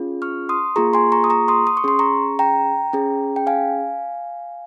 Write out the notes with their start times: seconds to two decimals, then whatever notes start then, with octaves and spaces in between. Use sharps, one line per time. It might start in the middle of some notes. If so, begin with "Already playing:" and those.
Already playing: C#4 F4 G#4
0.22 C#6 F6
0.49 C6 D#6
0.76 A#3 F4 G#4 A#5 C#6
0.94 G#5 C6
1.12 A#5 C#6
1.24 D#6
1.30 A#5 C#6
1.48 C6 D#6
1.67 D#6
1.77 C#6
1.84 C#4 G#4 C6
1.99 A#5 C#6
2.39 G5 A#5
2.93 C#4 G#4
3.36 G5
3.47 F5 G#5